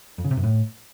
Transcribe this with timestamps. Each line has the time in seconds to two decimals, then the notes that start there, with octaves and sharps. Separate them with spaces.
0.18 F2
0.25 C#3
0.31 C3
0.37 F#2
0.43 A2